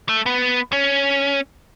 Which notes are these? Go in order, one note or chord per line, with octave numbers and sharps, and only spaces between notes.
A3
B3
C#4